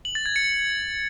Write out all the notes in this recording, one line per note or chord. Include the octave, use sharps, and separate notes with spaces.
F#7
A6
G#6
C#7